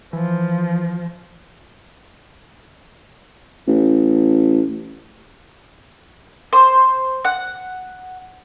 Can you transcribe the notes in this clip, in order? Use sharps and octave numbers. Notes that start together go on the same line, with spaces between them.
E3 F3
A1
C5
F#5